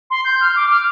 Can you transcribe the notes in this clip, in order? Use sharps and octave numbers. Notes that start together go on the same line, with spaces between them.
C6
G6
F6
D6
F6